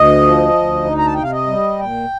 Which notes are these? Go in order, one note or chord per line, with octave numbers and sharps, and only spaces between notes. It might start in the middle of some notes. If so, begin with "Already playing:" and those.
Already playing: D2 D#5
F3
D2
D#4
A#5
A5
C3 G5
F5
D#5
G3
A#2 G5